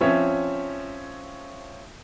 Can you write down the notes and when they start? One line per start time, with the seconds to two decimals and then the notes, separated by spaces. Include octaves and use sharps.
0.01 F3 C4 C#4 C#5 E5